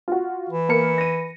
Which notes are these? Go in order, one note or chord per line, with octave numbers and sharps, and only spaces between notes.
F4 F#4
E3
A#3 A#4 C#7
A#6 D#7